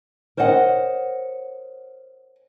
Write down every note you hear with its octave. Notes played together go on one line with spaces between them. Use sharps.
A#4 C5 C#5 D#5 F#5